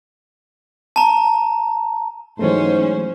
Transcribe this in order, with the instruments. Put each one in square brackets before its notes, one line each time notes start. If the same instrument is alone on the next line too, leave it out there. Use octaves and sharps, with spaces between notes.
[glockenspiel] A5 A#5
[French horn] G#2 [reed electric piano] E3 F#3 A3 [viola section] C#4 C5